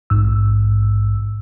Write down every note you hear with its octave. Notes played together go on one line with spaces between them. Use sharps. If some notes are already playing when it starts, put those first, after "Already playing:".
A#1 G#2 E6